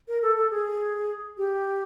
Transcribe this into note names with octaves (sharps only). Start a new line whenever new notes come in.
A#4
A4
A4
G#4
G4